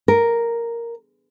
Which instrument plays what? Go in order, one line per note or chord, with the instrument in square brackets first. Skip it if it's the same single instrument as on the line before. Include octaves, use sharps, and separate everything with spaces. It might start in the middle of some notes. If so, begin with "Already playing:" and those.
[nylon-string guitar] A#4